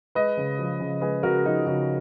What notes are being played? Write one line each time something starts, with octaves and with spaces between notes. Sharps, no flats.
G#3 B4 D#5
C#3
F3
C#3
G#3 G#4 B4
C#3 F#4 A#4
F3 D#4 F#4
C#3 D#4 F#4